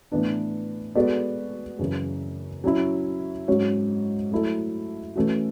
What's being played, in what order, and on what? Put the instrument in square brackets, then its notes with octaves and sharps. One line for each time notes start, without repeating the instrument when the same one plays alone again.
[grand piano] A2 E3 B3 D4
G#3 B3 F#4 A4 D5
F#2 C#3 E3
F#3 C#4 E4
G#2 F#3 C#4 F#4 C#5
F#3 A3 E4 A4
E3 A3 C#4 F#4